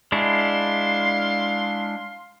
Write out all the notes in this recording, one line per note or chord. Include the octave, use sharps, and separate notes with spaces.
G#3 D4 E4 F5 C6